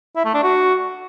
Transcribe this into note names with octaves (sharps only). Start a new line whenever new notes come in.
E4
A3
D4
F#4